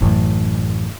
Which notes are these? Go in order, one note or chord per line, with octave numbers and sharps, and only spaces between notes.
A1 F#2